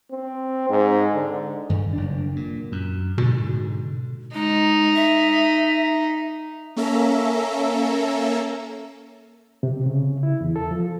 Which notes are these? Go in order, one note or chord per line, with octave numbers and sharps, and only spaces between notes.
C4
G#2
D3
G2 D#3
F#1 D4
A#2
F#2
G#2 B2 D3
G#3 D#4
E5
A#3 C#4 A4 E5 A#5
C3
C#3
E4
E2
A4
F3